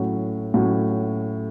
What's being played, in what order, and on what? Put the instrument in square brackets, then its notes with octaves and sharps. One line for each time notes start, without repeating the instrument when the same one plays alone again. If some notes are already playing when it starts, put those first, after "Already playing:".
Already playing: [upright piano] A2 F#3 C#4
A2 F#3 C#4